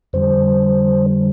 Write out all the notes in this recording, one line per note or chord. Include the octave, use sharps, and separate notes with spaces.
F2 D3 G3 C5